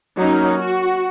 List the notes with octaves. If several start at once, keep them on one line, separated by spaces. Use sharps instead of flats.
F#3 A#3 C#4 D#4
F#4